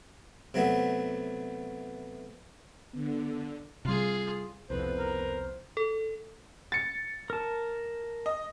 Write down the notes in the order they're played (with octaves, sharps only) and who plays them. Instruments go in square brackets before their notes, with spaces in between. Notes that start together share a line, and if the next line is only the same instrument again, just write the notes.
[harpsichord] C3 F#3 A3 B3
[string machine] D3 [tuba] B3
[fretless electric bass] C3 G3 [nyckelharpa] F4 G#4
[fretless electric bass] C2 F2 B2 [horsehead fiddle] B3 B4 [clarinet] C5
[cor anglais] A#4
[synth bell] A4
[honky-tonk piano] A6 C#7
[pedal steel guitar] A#4 A5
[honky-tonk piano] D#5